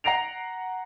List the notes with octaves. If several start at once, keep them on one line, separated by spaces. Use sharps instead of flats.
F#5 A#5 A#6 C7 D7 F7